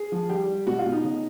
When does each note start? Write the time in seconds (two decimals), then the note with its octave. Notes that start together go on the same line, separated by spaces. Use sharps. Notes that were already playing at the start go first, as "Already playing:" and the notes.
Already playing: G#4
0.12 F3
0.30 G3 G4
0.48 G3
0.67 B2 F#4
0.79 F4
0.86 B2
0.92 D#4
1.04 C#3